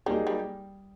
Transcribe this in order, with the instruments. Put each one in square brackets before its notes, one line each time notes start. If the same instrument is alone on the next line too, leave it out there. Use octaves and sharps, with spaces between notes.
[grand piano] F#3 A#3 D#4 G#4 [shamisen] G3
[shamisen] G3